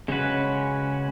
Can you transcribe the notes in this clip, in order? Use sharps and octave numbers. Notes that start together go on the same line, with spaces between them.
C#3 G#3 C#4 F#4 B4